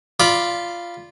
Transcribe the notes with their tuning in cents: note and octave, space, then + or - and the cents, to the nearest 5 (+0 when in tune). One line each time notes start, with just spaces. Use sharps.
F4 -10 D5 +0 B5 -15